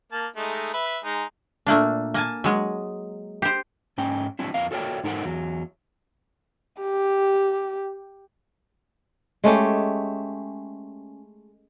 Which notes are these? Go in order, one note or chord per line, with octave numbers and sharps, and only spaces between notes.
A#3 A5
G#3 A3 D#4
B4 E5
G#3 D#4
A#2 A3 A#3 D4
A#3 G#5 A5
F#3 G#3
G4 C5
G#2 C#4 G5
F#3 C4 D4 E4
F2 C4 A#4 F5
F#4 A4 A#4 C#5 D5 G5
G#2 D#4 A4 A#4 C5 F#5
E2 F#3
G4
G#3 A3 C#4 G4